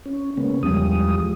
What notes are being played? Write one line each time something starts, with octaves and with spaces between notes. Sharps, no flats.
C#4
C#3 G#3 A#3 B3 C#4
E2 F3 G3 G#3 D#6